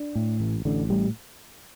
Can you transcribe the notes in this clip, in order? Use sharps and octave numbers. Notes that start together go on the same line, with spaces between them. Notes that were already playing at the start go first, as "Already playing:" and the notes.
Already playing: D4
A2
A1
A1 D3
A2 G3